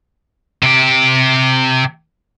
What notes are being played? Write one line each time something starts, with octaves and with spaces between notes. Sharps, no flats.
C3 G4